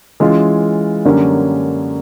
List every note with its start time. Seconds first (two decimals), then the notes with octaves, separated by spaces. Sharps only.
0.20 E3 G#3 C#4 F4
1.05 F#2 D3 G3 A#3 C#4